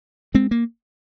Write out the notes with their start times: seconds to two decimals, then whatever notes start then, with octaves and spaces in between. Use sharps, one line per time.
0.34 G#3 C4
0.51 A#3